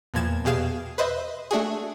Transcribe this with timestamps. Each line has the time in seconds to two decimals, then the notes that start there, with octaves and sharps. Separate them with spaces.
0.14 E2 A#2 F3 G#6 A6 E7
0.44 E2 B2 G4 G#4 F5 E7
0.98 B4 C5 D#5 E5
1.51 A3 D4 F#4 G#4